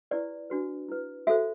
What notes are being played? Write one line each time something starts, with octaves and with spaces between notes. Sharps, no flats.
E4 G4 B4 D5
D4 F#4 B4
E4 B4
F#4 A4 C5 E5